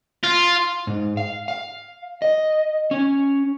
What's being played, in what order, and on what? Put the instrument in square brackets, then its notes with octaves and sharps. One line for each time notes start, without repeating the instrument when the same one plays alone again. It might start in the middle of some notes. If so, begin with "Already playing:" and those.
[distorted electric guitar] F4
[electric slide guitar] G#2
F5
F5
D#5
C#4